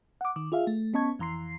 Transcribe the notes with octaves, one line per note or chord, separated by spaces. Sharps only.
F#5 D6
D#3 D6
F4 G#4 E5 F5
A3
B3 C#4 D#5 A5 C#6 G#6
F2 E3 A#5 C6 C7